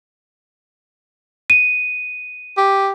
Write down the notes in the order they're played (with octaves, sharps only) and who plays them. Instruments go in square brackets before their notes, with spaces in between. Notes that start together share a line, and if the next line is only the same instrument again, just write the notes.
[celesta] D#7
[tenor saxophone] G4